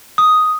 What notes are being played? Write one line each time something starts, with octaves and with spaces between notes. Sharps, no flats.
D#6